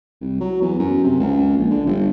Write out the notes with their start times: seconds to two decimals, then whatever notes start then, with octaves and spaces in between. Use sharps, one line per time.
0.21 C2
0.41 F#3
0.62 E2
0.79 F#2
1.04 C3
1.20 C#2
1.58 A#1
1.71 D3
1.87 G1